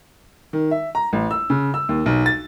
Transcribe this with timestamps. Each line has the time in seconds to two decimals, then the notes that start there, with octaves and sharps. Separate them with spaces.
0.53 D#3
0.71 E5
0.95 A#5
1.13 A1
1.31 E6
1.50 C#3
1.74 E6
1.89 D#2
2.06 B1
2.26 A6